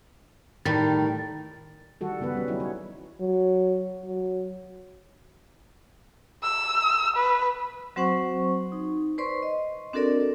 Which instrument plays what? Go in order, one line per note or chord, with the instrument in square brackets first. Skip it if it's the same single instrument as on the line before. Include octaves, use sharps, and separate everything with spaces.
[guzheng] A2 G3 [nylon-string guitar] D#3 [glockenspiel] A6
[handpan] D#3 G3 F#4 A4
C#3 B3 F#4 B4
G3 C#4
F#3 C#4 D#4 E4
C#5
[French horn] F#3
F#3
[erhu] E6
B4
[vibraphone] F#3 C4 F#4 C5 F#5 C#6
D#4
B4 C5 D5 C6 C#6
D#5
C4 D4 F#4 A4 A#4 D5